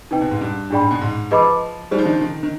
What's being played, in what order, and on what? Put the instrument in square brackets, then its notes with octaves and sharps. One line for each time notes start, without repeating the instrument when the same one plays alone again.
[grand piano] C3 [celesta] D#4 B4 D#5 G5
[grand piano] B2
G#2
G2
[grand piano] G#2 [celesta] D4 G#4 D5 G5 B5
[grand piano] G#2
B2
G#2
[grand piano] F3 [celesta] G#4 B4 D#5 B5 D6
[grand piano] G3 [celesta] D#4 G#4 C5
[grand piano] F3
D#3
F3
D#3
D#3